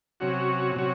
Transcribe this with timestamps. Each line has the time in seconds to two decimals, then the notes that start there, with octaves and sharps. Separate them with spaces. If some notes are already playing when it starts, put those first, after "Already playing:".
0.20 C3 F#3 C#4 F#4
0.76 C3 F#3 C#4 F#4